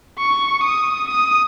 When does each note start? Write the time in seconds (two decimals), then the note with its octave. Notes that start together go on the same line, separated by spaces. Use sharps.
0.19 C#6
0.64 D#6
1.09 D#6